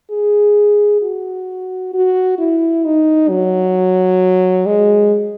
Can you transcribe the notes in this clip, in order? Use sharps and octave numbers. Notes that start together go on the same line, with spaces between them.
G#4
F#4
F#4
E4
D#4
F#3
G#3